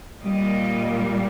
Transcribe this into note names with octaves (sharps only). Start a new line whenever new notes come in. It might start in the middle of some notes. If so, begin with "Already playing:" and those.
A#2 G3 A#3 D#5